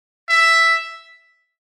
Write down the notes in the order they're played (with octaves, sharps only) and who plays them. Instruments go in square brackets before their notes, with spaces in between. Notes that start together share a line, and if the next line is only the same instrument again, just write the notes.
[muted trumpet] E5